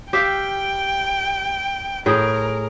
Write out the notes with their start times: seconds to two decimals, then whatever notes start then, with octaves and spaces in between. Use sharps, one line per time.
0.13 G4 E5 F5 G5
2.06 A2 G#4 A#4 G5